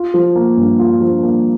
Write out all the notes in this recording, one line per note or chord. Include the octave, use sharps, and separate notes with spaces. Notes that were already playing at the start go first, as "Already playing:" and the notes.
Already playing: F4
F3
A#3
G2
F4
F3
A#3